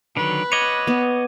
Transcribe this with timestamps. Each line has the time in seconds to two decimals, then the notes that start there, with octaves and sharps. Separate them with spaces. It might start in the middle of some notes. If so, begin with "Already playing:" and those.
0.17 D3 D#3 F#3 B4
0.52 C#5 D#5 F#5 D6 G#6 D#7
0.87 B3